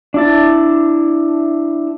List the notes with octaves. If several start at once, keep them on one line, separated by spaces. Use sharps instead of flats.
D4 E4 A5